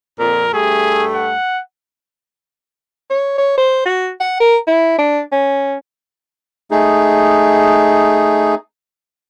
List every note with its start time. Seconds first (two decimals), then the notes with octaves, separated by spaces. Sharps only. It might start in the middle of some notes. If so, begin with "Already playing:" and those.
0.20 F2 A#2 A#4
0.54 G2 G3 A3 G#4
1.14 F#5
3.10 C#5
3.38 C#5
3.58 C5
3.85 F#4
4.20 F#5
4.40 A#4
4.67 E4
4.98 D4
5.32 C#4
6.71 A3 D#4 G#4